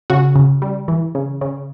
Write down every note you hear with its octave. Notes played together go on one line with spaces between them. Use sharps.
C#3 F#4
C#3
G3
E3
C#3
C#3